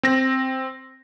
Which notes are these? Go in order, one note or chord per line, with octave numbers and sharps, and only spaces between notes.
C4 A#6